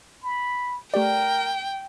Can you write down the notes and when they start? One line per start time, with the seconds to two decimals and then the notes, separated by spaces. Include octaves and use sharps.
0.24 B5
0.94 A3 G4 A#4 D5 G5